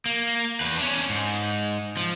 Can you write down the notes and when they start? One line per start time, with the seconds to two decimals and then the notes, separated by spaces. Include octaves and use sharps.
0.06 A#3
0.61 E2 B4
0.77 C#4 D4
1.09 G#2
1.97 F3